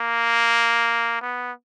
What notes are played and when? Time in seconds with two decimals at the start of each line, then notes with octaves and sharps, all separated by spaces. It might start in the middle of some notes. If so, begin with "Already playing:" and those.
Already playing: A#3
1.22 B3